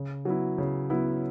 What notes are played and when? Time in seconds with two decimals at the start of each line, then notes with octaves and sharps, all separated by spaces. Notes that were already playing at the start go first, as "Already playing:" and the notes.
Already playing: C#3
0.25 F#3 B3 E4
0.58 C#3
0.90 F#3 B3 E4